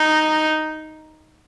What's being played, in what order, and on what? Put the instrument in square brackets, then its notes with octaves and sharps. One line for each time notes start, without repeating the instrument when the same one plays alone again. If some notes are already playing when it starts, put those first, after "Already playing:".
Already playing: [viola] D#4